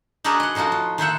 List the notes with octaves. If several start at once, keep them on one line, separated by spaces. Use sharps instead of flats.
D4 D#4 F#4 G#4 A#4 B4
D#5 F#5
A2 F3 D#4 F4 F#4
F4
D#3 C5 E5 F#5